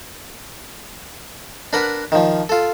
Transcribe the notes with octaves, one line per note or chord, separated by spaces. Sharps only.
D4 A#4 B4 F#5 B5
D#3 F3
F4 A4